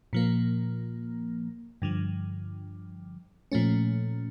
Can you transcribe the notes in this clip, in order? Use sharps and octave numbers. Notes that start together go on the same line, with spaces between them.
A#2 F3 A#3
G2 D3 F3
A#2 F3 A3 C#4